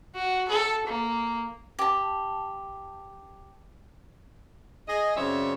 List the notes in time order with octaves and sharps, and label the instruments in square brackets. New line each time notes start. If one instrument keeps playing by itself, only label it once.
[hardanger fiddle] F#4
A4
A#3
[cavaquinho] G4 A5
[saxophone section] G#4 D#5
F#2 C#3 C4 C#5 D5 E5